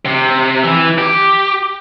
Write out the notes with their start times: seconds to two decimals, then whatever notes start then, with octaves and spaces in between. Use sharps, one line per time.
0.05 C3
0.64 E3
0.99 G4